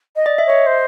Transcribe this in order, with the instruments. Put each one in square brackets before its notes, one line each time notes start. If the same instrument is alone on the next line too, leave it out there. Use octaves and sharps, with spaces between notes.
[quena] D#5
[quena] D5 [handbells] D#5
[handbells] E5
[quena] C#5 [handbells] D#5
[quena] C5